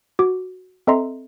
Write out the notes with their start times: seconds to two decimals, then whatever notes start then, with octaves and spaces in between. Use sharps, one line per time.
0.19 F#4 D6
0.87 C4 A4 D#5 E5 A#5 C6